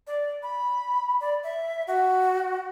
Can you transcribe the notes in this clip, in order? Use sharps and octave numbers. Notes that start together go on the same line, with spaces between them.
D5
B5
D5
E5
F#4